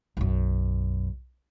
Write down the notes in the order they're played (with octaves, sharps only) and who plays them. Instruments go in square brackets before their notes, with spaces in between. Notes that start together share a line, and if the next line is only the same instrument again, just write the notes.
[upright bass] B1 F#2